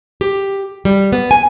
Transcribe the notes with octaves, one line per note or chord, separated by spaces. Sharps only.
G4
G3
B3
G#5